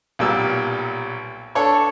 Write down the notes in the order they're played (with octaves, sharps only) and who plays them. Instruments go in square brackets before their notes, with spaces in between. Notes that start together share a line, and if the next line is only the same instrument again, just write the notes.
[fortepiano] B1 A#2 G3 E6
D4 A4 C#5 C#6